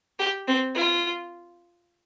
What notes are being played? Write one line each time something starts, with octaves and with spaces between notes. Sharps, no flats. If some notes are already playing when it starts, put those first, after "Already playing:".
G4
C4
F4